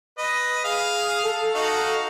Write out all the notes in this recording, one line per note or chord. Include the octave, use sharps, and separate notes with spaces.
B4 D#5
G#4 F5
A4
D#4 F#4 F5